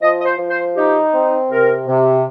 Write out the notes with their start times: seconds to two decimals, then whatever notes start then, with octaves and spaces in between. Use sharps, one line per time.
0.01 F3 D#5
0.20 D#5
0.25 C5
0.37 F3
0.50 C5
0.75 D#4 G4
1.13 C4
1.49 C3 A#4
1.87 C3